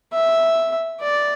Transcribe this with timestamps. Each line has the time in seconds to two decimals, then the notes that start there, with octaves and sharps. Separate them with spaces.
0.13 E5
1.01 D5